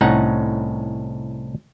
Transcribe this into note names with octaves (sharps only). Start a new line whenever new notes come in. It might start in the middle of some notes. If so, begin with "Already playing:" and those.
C2 A2 C#4 D#4 F#5 A#5